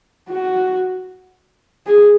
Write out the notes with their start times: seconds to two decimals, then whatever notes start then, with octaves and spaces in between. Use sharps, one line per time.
0.30 F#4
1.86 G#4